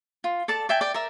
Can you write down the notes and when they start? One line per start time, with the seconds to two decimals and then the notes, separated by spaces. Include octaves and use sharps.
0.24 F4
0.48 A4 D5 A5
0.69 D5 E5 G5 G#5
0.81 D5 G5
0.94 A#4 D5 E5